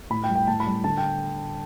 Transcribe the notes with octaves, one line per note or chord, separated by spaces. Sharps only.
A2 B5
G5
G3
G5
A2 A5
B5
G3
D3 A5
G5